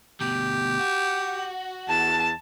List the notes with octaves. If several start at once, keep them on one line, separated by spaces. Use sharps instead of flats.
D2 B2 G4
F#4
E2 A5